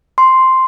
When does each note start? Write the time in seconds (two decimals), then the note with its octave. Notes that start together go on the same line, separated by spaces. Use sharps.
0.18 C6